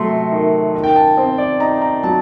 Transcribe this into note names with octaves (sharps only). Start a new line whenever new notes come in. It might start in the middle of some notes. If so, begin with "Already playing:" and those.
Already playing: C3 F#3 A3 C6
D#3
D#3
G5
A5
C4
D5
D#4 A#5
A#5
F#3 A5